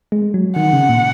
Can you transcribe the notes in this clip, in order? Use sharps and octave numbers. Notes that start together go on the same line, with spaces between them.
G#3
F#3
D#3 F#5
C#3
A#2